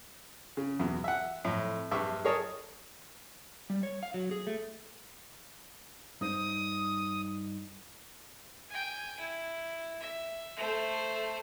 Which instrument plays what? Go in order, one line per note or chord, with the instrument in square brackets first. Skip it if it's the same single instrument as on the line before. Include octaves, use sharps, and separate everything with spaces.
[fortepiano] C#3
E2 B2
E5 F#5
F2 A2
A#1 G2 E5 C#6 D6
G#4 A#4 C#5 D#5 A5
[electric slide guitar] G3
C#5
F5
F#3
G#4
A3
[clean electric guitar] G2 D#4 C5 [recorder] D#6
[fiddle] G5 G#5
E4
E5
A3 C5